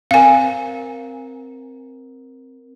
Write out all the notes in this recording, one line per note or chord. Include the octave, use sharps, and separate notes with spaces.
C4 A#4 F5 G#5